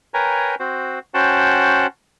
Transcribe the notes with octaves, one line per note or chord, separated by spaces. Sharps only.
A#4 B4 C#5 G5 G#5 A#5
C4 F#4 C5
C#4 F#4 C5 F#5 G5 A5